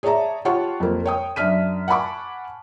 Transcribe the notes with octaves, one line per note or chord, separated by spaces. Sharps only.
G#4 C#5 D5 E5 A5 A#5
F4 G4 C#5 F#5 A5 C#6
F2 A#3
A#4 C#5 G5 D#6
F#2 D4 E5 F6 B6 D#7
F#5 G#5 A5 B5 C#6 D6